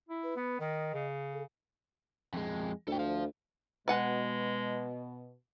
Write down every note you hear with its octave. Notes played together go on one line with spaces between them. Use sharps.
E4
B4
B3
D#3 D#5
C#3
A4
F2 G#3
D2 A4 G5
C5 F5
B2 G#3 B4 F#5 G#5